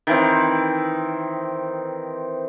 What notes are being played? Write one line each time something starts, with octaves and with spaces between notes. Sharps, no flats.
D#3 E3 C4